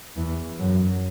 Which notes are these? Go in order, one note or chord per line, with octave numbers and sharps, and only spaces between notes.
E2 E3
F#2 F#3